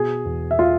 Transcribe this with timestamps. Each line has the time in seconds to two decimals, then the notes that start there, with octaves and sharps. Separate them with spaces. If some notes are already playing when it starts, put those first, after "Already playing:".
Already playing: B2 G#4 G#5
0.25 E2
0.51 E5
0.59 F4 F5